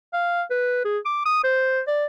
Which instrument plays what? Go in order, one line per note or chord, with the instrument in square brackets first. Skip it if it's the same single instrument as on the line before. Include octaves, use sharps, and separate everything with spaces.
[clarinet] F5
B4
G#4
D6
D#6
C5
D5